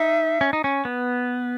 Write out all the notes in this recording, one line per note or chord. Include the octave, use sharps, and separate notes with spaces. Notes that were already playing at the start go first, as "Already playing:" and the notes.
Already playing: D#4 E5
C#4
D#4
C#4
B3